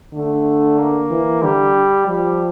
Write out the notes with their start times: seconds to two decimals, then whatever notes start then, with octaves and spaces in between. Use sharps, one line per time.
0.14 D3 A3
0.78 A#3
1.11 E3
1.42 D3 G3
2.07 F3 G3